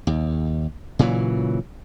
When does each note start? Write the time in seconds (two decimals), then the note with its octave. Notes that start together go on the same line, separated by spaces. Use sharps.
0.07 D#2
0.99 A#2 C#3 E3 F#3